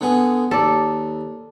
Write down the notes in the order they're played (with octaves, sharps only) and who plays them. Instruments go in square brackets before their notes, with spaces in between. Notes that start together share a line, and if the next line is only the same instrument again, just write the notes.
[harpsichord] D3 B3 G#4
[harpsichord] D#2 [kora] A4 D5